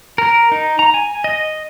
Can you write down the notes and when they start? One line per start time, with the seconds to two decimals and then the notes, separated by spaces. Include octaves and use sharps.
0.18 A#4
0.52 D#4
0.79 A#5
0.94 G#5
1.24 D#5